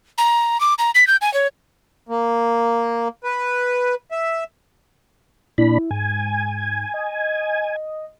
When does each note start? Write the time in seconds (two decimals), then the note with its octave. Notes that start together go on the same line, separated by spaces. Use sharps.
0.18 A#5
0.60 D6
0.78 A#5
0.95 B6
1.07 G6
1.21 G#5
1.34 C#5
2.09 A#3
3.24 B4
4.11 E5
5.58 A#2 D4 E4 B5
5.91 G#2 G#5
6.94 D#5